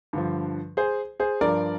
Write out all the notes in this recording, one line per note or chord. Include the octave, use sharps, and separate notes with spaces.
G2 D3 F3
G#4 C5
G#4 C5
G2 F3 A#4 D5